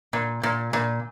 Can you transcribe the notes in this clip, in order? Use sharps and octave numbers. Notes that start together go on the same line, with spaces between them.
A#2
A#2
A#2